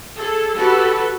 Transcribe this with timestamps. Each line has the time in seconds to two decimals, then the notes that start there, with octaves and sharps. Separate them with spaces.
0.19 G#4 A4
0.56 F#4 G4 A4 B4